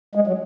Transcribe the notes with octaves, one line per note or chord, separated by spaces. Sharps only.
G#3
F#3